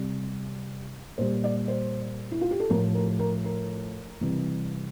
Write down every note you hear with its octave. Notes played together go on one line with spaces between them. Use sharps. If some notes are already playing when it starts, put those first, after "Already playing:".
Already playing: C3 G3
A#2 G3 C5
D5
C5
E4
F4
G4
A4
A2 F3 A#4
A#4
A#4
A#4
C3 E3 G3